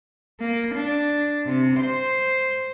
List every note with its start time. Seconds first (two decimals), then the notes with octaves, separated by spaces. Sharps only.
0.40 A#3
0.75 D4
1.46 C3
1.80 C5